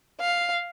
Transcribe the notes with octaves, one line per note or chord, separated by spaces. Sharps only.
F5